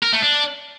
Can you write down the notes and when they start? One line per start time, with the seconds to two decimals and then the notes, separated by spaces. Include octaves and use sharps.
0.03 A#4
0.13 A3
0.23 D4